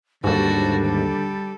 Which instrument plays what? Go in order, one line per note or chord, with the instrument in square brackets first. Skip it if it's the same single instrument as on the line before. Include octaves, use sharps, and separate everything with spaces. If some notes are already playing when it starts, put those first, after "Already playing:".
[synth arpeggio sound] D#2 G#2 [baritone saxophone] D3 [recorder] G3 [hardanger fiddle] F#4 A4
[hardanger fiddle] A4